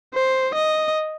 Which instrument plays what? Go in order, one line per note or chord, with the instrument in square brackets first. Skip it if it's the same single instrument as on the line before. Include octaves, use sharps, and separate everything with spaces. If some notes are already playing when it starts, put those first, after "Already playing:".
[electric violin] C5
D#5